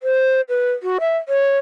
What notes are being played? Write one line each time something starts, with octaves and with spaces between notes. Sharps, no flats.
C5
B4
F#4
E5
C#5